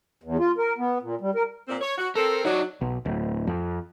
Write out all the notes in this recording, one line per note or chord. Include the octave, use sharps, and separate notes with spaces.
E2
F4
A#4
B3
A#2
G3
A#4
A#2 C4
C#5
F#4
C4 A4 A#4
F#3 D#4 D5
B1
D1
F2